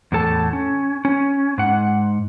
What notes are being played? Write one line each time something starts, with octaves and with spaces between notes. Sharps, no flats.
E2 A2 A4 A5
C#4
C#4
G#2 F#5